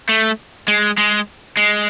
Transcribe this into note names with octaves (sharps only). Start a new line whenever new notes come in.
A3
G#3
G#3
G#3